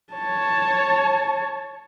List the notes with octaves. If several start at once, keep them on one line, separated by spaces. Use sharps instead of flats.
C#5 A5